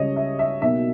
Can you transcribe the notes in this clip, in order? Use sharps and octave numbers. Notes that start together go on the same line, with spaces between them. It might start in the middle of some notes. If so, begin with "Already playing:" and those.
Already playing: C#2 C#3 G3 C#5 D#5
E5
E5
B1 B2 A#3 E5